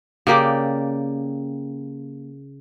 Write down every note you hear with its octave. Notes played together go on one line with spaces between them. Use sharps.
C#3 A#3 G4 D5